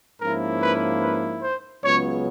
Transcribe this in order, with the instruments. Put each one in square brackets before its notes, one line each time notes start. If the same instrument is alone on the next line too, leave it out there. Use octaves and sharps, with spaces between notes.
[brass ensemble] G#2 F3 A#3 C#4 E4 A#4
B4
B4
C5
C#2 C#3 F#3 B3 C#5